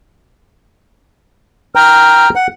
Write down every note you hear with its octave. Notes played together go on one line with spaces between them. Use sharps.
G5 A#5 F6
F#5